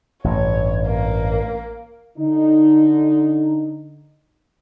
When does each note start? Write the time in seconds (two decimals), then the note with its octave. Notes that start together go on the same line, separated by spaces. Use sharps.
0.24 A1 G2 C#5
0.87 A#3
2.18 D3 D#4